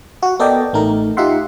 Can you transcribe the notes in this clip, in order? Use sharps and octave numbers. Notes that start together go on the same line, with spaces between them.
F#4 F#5
B3 A4 A#4 D5 D#5 G5
A1 A3 D#4 A#4
D#4 F4 G4 E5 F#5 C6